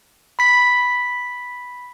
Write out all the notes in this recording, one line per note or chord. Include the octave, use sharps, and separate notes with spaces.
B5 B6